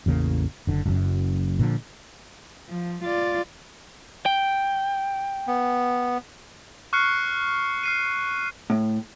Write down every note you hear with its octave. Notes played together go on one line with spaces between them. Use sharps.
A1 E2 C#3 A#3
F#1 D3
F#1 F#2
A#2 D3 F3
F3
F4 D5
G5
B3
C#6 F6 F#6 C7 C#7
F6 C7 D#7
A2